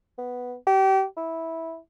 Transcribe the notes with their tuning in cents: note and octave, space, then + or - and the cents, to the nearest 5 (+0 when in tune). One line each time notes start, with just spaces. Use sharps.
B3 +0
G4 -30
E4 -10